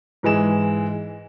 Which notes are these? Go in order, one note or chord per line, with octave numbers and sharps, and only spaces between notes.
G#2 E3 G#3 E7